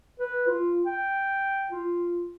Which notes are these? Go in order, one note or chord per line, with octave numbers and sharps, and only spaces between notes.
B4
F4
G5
F4